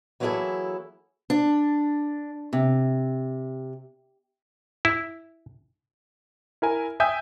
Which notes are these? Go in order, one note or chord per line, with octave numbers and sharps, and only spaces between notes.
E3 F#3 A#3 E4 G#4 A4
D4
C3
E4
E4 A#4 G#5
E5 G5 G#5 D#6 G6